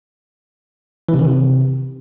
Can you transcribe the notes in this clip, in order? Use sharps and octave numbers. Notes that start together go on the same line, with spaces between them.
E3
C3
D#3
C3